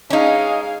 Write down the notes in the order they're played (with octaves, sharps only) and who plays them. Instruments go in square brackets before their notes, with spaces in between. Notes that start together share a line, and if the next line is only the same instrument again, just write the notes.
[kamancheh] G#3 F5 [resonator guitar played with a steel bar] C#4 D#4